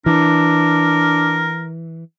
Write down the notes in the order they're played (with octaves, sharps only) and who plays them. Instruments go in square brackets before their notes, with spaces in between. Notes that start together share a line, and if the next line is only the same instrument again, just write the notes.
[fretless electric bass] E3 [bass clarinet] D4 [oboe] A#4